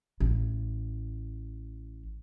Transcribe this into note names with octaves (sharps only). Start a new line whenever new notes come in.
A1 E3